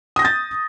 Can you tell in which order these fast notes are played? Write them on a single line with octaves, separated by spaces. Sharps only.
D#6 A#6 G6 A6